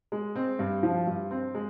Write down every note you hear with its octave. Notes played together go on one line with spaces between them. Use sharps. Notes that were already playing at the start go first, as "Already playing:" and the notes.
G#3
C4
G2
F3
G2
C4
G#3